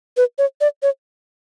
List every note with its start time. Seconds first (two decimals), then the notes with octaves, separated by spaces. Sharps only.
0.17 B4
0.38 C#5
0.61 D5
0.83 C#5